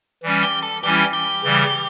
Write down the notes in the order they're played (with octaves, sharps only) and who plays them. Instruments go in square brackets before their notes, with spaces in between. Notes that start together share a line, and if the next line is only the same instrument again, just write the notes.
[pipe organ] E3 G3 C#4
[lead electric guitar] G4
A4
[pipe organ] E3 G3 C#4 E4 [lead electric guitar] G4
[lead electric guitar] G4
[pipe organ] C#3 E3 G3